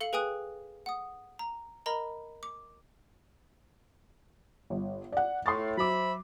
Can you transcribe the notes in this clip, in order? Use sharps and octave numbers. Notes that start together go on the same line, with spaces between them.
A4 F5 C#7 F#7
G#4 B4 G5 G#5 D#6 F#6
F#5 D#6
A#5
A#4 D#5 A#5 B5
D6
G1
D5 F#5
A2 C6 C#6 A6
F#3 C5 E5 B5 D6